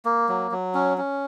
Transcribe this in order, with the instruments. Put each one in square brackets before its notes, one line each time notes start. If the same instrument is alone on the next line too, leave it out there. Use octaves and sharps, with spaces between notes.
[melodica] A#3
F#3
F#3
C#4
C#4